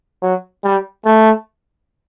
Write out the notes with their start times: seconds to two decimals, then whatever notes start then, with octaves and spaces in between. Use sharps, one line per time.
0.22 F#3
0.64 G3
1.05 A3